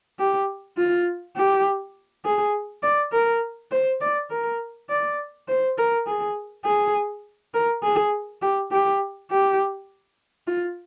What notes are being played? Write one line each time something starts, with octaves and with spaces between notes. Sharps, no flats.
G4
F4
G4
G#4
D5
A#4
C5
D5
A#4
D5
C5
A#4
G#4
G#4
A#4
G#4
G4
G4
G4
F4